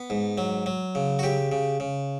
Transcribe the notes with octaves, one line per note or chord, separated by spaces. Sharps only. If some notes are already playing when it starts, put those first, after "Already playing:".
Already playing: B3
G#2
F#3
F#3
C#3
F#4
C#3 G4
C#3
C#3